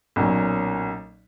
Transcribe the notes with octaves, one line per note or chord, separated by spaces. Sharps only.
B1 A#2 F#3 A#3 C#4